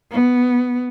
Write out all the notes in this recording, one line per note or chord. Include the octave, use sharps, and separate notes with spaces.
B3